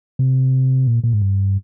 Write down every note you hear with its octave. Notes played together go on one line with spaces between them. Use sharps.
C3
A#2
A#2
G#2
G2